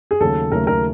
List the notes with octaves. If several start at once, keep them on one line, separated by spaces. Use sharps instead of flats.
G#4
D#2 C#3 F#3 A3 A4
D#2 C#3 F#3 A3 A#4
A#4